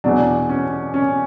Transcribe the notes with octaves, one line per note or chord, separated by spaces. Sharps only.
E2 B2 F#3 D4
C#4
C#4